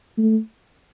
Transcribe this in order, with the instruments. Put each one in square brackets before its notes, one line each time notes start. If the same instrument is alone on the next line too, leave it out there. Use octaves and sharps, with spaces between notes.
[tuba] A3